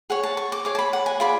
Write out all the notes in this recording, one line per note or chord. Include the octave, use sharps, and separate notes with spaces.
G#4 C#5 F#5
A5
C#6
D6
G#4 C#5 D6
A5
B5
F#5
G#5
F4 G#4 D5 B5